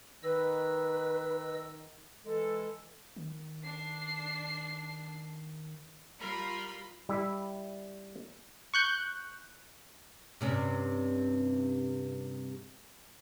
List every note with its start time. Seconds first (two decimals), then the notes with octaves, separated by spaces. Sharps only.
0.23 D#3 B4 D#5 E6
2.25 E3 G#3 A4
3.16 D#3
3.64 D4 C7
6.19 G3 F4 A#4 B5 C6
7.09 G3 E4 E5
8.74 C#6 F#6 G6
10.41 G2 C3 C#4